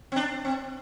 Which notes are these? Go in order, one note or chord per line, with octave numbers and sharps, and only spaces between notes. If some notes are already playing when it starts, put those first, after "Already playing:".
C4
D4
C4